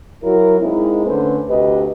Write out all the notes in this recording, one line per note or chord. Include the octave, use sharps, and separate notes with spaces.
F#3 E4 A#4
G#3 A#3 C4 D#4 E4
D3 A3 C#4 A4 B4 C5
D2 C3 G4 B4 D#5